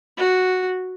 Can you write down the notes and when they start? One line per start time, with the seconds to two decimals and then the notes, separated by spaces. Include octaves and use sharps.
0.18 F#4